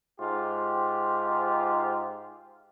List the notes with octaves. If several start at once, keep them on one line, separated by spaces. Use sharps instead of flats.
G#2 F4 G4